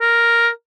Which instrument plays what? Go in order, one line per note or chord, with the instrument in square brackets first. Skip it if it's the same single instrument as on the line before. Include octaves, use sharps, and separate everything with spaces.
[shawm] A#4